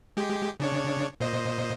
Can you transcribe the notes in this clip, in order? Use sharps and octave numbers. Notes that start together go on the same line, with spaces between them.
G#3 G4
C#3 D4 C#5
A#2 C5 D#5